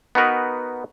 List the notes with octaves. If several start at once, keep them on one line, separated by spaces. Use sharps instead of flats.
B3 D#4 F#4 A#4 B4